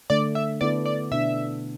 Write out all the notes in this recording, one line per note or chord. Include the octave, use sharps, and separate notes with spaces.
D3 A3 D4 D5
E5
D3 B3 E4 A4 D5
D5
B2 B3 D4 E5